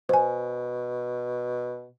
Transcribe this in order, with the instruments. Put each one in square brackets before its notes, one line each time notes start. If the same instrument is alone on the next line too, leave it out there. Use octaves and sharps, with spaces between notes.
[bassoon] B2 [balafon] C5 G#5